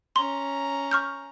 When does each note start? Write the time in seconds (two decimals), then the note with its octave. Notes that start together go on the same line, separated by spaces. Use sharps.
0.16 C#4 A#5 C6
0.91 C#6 F6 G6